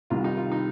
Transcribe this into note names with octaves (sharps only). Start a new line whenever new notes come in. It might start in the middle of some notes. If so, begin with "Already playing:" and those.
C2 C3 D#3 G3 F4
D#4
F4
D#4